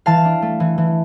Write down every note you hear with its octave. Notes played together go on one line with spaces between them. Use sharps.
E3 F5 A5
D4
A3
E3
E3